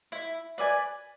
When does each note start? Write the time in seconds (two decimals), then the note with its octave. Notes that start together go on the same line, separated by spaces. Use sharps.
0.12 E4
0.58 B4 D5 G#5